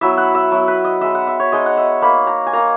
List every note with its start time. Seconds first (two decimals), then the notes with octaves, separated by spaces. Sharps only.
0.01 F#3 B3 E4 E5
0.18 F#5
0.35 E5
0.51 F#3 B3 E4
0.68 B4
0.85 D#5
1.01 G#3 D#4 E5
1.15 F#5
1.27 E5
1.40 C#5
1.52 G#3 D#4 D#5
1.66 F#5
1.77 E5
2.02 A#3 D#4 B5
2.27 A#5
2.47 G#5
2.53 A#3 D#4 A#5